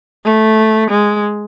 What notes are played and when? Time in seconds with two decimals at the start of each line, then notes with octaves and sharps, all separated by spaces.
0.24 A3
0.90 G#3